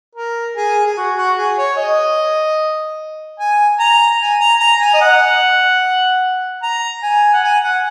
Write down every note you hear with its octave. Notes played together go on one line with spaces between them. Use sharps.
A#4
G#4
G#4
F#4
F#4
G#4
C#5
D#5
G#5
A#5
G#5
A#5
A#5
G#5
D#5
F#5
A#5
G#5
F#5
G#5
F#5